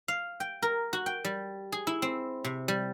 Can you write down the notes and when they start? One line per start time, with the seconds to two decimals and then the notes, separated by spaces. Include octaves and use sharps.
0.08 F5
0.40 G5
0.62 A#4
0.93 F#4
1.06 G5
1.25 G3
1.72 G#4
1.87 E4
2.02 C4
2.44 C3
2.68 G3